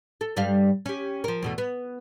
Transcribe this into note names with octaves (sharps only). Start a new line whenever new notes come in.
A4
G2 G3 F5
C#4 G4
F3 A#4
E2 B2 A3
B3